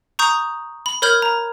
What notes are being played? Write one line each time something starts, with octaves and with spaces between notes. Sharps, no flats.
A#5 C#6 D#6 G6
B5
A#4 C#5 B5 F6 G6 G#6
A#5